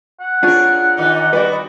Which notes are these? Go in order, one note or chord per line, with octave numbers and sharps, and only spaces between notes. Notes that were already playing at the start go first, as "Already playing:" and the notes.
F#5
D4 F4 G#4 A#4 C#5
A#2 D#3 D#4
G3 B3 F#4 B4 D5